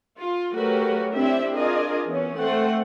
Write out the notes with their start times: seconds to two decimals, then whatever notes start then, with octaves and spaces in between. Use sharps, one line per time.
0.19 F4
0.54 F#3 A3 F#4 G4 A#4 B4
1.14 C4 D4 E4 G4 E5
1.55 D4 F4 G#4 A#4 D#5
2.07 E3 B3 C#4
2.39 A3 C4 C5 F#5